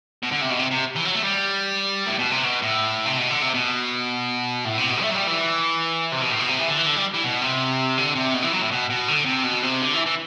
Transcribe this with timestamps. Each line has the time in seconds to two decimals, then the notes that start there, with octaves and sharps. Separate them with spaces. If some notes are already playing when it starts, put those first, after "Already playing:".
0.23 B2
0.31 D3
0.41 C3
0.50 B2
0.59 C3
0.71 C3
0.96 E3
1.05 F#3
1.15 A3
1.24 G3
2.07 A2
2.19 B2
2.31 C3
2.44 B2
2.62 A2
3.06 C3
3.17 B2
3.30 D3
3.42 C3
3.54 B2
4.65 A2
4.78 C3
4.90 B2
5.01 A3
5.10 F#3
5.14 G3
5.27 E3
6.12 C3
6.22 B2
6.31 A2
6.40 B2
6.49 C3
6.59 E3
6.68 D3
6.77 E3
6.86 D3
6.96 G3
7.14 E3
7.24 B2
7.42 C3
7.98 D3
8.15 C3
8.34 B2
8.42 E3
8.53 F#3
8.62 A2
8.71 B2
8.90 B2
9.08 D3
9.25 C3
9.44 B2
9.63 C3
9.82 D3
9.94 E3
10.06 E3